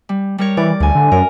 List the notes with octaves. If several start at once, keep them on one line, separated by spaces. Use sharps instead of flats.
G3
G3 A#4 C#5
E3 D5
D2 A2 G#5
D3
F#2 A#4